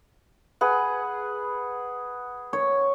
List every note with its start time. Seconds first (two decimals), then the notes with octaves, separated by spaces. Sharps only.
0.61 G#4 B4 F#5
2.53 C#5